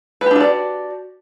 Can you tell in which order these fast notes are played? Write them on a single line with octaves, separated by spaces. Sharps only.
B4 G4 D4 F#4 D5